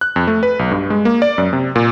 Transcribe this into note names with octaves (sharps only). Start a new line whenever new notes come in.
F#6
F2
A3
B4
B1
G2
G#3
A#3
D5
F#2
C3
A#2